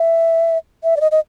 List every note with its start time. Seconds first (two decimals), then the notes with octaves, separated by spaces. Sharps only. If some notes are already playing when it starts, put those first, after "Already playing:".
Already playing: E5
0.84 E5
0.97 D5
1.01 D#5
1.12 D#5